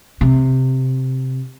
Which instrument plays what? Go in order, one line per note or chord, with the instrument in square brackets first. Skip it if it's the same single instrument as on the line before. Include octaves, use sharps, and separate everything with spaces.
[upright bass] C3